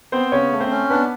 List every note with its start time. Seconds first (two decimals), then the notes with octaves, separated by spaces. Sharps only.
0.12 B3 C4 C5
0.32 C#3 C#4 C#5
0.52 A3
0.60 C4 C5
0.71 C#4
0.90 B3 D4 B4